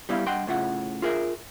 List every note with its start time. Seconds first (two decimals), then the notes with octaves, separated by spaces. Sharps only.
0.09 G3 B3 E4 F5
0.26 G2 D#5 F#5 G5 C6
0.47 A2 C#3 F4 E5 F#5
1.02 F4 G#4 A#4 E5